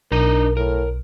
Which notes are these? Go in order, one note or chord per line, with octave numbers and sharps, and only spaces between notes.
B1 D4 D#4 A#4 A#5
A2 A#4